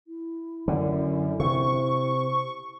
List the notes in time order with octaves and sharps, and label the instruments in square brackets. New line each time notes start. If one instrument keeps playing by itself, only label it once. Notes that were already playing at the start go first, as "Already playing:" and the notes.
[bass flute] E4
[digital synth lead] F#2 [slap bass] D3
[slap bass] C3 [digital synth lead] C#6